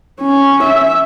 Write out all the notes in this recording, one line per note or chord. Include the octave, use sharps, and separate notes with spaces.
C#4
E5